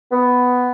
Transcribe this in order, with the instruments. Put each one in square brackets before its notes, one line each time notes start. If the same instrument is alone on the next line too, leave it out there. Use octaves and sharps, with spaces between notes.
[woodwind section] B3